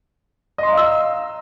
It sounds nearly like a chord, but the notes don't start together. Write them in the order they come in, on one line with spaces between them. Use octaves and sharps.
D#5 C6 A#5 F5 E6